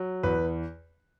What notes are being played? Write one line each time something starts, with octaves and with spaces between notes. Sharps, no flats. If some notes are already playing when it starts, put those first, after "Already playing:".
Already playing: F#3
E2 B4